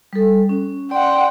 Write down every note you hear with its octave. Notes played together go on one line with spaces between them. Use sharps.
G3 A4
C#4
D5 F#5 G5 C6